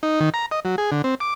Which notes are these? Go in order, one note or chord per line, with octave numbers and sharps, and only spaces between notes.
D#4
D#3
A#5
D#5
F#3
G#4
D3
C4
D6